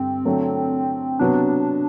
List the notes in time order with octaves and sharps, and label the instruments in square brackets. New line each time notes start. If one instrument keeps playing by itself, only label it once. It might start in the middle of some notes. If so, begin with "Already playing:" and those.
Already playing: [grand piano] G2 D3 G4 [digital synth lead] C4
[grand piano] D3 F#3 A3
[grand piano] C3 F#3 B3 F#4 [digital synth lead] D4